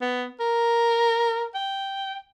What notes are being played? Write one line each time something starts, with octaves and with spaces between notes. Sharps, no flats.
B3
A#4
G5